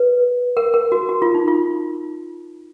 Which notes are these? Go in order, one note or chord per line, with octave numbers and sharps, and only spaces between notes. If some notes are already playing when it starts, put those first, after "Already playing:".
Already playing: B4
A#4
A#4
F#4
F#4
F4
D#4
F4